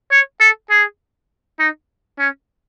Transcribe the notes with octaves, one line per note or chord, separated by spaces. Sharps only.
C#5
A4
G#4
D#4
C#4